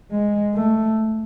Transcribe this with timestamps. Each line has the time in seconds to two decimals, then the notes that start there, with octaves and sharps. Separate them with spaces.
0.11 G#3
0.54 A3